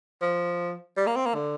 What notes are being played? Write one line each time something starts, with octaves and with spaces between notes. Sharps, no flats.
F3
G3
A#3
C4
A#3
D3